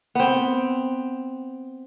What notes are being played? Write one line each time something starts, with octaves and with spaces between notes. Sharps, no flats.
B3 C4